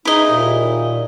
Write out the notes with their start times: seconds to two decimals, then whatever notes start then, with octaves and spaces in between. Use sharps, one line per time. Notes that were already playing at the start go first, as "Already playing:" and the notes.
0.05 G#3 D#4 E4 D#5
0.29 D#2 A#2